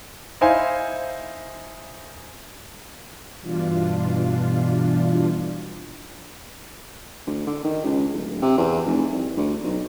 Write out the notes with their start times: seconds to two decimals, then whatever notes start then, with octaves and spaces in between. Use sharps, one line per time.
0.41 D#4 E4 C5 F5 G#5
3.41 G2 B2 E3 D4 F4
7.27 D2
7.47 D3
7.64 D#3
7.84 C#2
8.13 D1
8.42 C3
8.57 E2
8.86 F1
9.12 C2
9.37 D2
9.64 B1